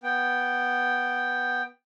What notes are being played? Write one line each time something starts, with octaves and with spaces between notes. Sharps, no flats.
B3 G5